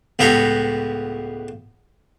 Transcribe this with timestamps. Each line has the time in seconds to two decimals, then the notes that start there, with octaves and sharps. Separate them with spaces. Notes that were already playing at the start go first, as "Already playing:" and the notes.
0.19 C#2 A2 B3 F#4 G4 A#5